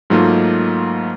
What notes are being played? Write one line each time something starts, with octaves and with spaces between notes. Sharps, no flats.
G#2 F#3 A3 A#3 D#4 F4